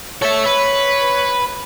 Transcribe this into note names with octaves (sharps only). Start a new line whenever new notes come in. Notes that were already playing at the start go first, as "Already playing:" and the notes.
A4 C#5 E5
B4